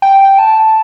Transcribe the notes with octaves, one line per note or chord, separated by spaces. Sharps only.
G5
A5